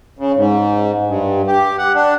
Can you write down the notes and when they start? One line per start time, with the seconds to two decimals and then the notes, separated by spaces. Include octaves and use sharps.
0.19 C#3
0.36 G#2
1.07 G2
1.47 G4
1.78 F#5
1.95 D4